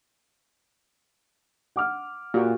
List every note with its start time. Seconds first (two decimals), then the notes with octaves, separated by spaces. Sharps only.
1.76 F#5 D6 F6
2.34 A#2 F#4 G4